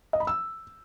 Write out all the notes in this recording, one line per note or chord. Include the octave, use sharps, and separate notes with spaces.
D#5
B5
E6